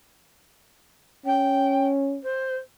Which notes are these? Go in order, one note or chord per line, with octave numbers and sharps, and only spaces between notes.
C#4 G5
C5